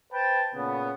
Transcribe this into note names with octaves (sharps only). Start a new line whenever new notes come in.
B4 C5 G5 A5
A#2 C#3 B3